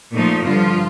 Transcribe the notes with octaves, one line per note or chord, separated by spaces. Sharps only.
A#2 F3 A3 D#4
G2 D3 F3 F4